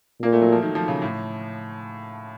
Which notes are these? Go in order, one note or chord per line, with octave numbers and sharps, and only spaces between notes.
A#2 A#3
A3
F#3
F3
D#3
F3
C#3
A2